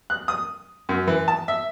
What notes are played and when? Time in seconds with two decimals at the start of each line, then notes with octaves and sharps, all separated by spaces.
0.10 F#6
0.28 D#6
0.89 F#2
1.07 E3
1.28 A5
1.48 E5